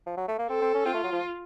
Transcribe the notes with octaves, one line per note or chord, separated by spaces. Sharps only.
F3
F#3
A3
A#3
C4 A4
C4
C#4
C4 F4
A3
F#3
F3